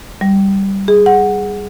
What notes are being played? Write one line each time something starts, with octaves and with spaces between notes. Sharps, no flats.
G3
G#4
F#5